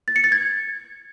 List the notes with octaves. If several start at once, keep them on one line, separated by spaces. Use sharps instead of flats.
A6
C#7
A6
G#6